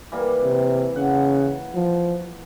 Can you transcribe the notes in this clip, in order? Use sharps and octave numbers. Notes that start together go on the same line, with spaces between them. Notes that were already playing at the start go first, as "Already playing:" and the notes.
E3 G3 A#3
C3
C#3 F#5
F3